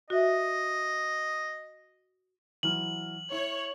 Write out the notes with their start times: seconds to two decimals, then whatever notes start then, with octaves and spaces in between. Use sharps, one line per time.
0.10 F#4 D#5 E5
2.63 E3 F#3 F6 F#7
3.32 E4 C#5